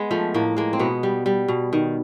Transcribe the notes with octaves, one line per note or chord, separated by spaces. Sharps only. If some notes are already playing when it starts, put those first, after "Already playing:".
Already playing: G#3 B3
F3 A3
A2 A#3
G#3 A#3
C4
B2 B3
G3
G3
B2
D#3